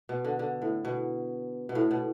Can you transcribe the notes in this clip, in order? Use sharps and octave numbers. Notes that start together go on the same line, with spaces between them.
B2
D3
D3
A2
B2
B2
A2
B2